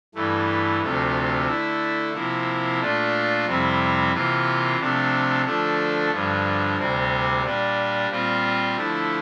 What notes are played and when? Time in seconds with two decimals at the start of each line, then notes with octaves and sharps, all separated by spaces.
0.15 G2 E3 A3
0.81 D2 C3 F3 A3
1.47 D3 A3 E4
2.14 C3 F3 A#3 E4
2.80 A#2 A3 D4 F4
3.46 F2 C3 G3 C4 E4
4.13 C3 E3 A#3 F4
4.78 C3 F3 A3 D4
5.45 D3 F3 A3 D4
6.12 G2 D3 F3
6.77 D2 C3 G3 C4
7.43 A#2 G3 D4
8.10 A#2 G3 C4 F4
8.76 D3 F3 A3 E4